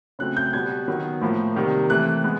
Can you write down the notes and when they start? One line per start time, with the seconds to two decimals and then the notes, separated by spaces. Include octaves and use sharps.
0.19 C#3 F#3 A3 C4 F#6
0.37 G6
0.53 B2 G3 B3 G#6
0.88 D#3 F#3 B3
1.21 A2 F3 A#3
1.56 C3 D#3 G3 A#3
1.90 E3 A3 C4 F#6
2.24 G#3 B3